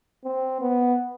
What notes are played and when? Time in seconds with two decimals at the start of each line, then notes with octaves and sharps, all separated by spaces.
0.24 C4
0.61 B3